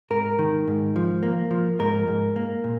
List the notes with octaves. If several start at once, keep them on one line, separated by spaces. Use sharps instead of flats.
G#2 A#4
D#3
G#2
F3
A#3
F3
G#2 A#4
G#2
A#3
A#2